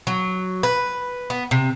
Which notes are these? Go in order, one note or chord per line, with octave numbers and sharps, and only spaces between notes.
F#3
B4
B3
C3